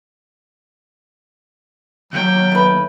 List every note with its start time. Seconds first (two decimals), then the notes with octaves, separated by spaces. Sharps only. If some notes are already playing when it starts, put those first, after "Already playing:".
2.13 D#2 F#3 C#5 G5
2.52 A3 B4